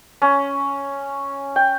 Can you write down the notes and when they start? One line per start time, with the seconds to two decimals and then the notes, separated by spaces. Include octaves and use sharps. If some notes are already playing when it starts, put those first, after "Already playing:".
0.22 C#4
1.56 G5